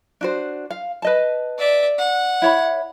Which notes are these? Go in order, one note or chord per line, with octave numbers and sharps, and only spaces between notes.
D4 F#4 C5
F5
B4 D#5 A5
D5 E5
F#5
E4 C#5 B5